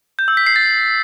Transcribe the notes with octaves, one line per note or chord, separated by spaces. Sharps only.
G6
E6
B6
C7
A6